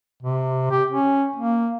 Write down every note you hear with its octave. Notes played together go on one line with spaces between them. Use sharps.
C3
G4
C#4
A#3